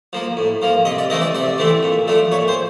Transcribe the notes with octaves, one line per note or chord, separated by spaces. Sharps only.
F3 A#3
A2
F3 A#3
C3 D#5
D5
E3 A3 C4 D#5
D5
C3 D5
E3 A3 C4
A#2
F3 A3 D4
A#2 C#5
C5